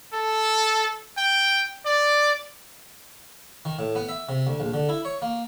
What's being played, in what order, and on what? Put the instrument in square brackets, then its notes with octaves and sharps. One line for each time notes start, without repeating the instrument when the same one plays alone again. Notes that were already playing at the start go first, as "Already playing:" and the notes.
[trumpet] A4
G5
D5
[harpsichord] D#3
A2
B3
E5
C3
D2
A#1
D3
E4
C#5
A#3